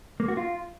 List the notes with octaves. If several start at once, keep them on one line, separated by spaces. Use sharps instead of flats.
A#3
F#4
F4